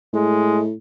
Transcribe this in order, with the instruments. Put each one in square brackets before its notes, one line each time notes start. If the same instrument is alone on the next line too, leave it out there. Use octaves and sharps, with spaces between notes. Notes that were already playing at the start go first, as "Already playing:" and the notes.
[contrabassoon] A2 [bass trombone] G#3